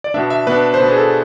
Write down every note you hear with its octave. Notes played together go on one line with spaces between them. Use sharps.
D5
B2 B3 D4 E5
E5
B2 B3 D4 B4
C5
B2 B3 D4 B4
G#4
A4